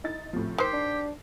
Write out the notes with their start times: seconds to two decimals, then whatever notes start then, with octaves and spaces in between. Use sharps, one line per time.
0.04 D#4 E4 A6
0.33 A2 C3 F3
0.58 D#3 G4 C5 B6 C7
0.73 D4